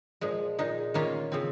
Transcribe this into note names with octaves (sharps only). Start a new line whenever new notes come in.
A#2 F3 G#3
A#2 G#3 D#4
D#3 A#3 C#4 F4
C#3 F3 C4